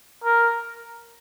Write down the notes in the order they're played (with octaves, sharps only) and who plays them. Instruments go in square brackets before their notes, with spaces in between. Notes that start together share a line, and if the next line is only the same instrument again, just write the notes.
[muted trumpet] A#4